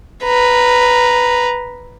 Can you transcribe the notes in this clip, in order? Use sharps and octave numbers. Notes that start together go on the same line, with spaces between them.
B4 A#5